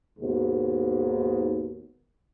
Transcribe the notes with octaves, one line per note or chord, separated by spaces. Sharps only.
D#2 G#2 B2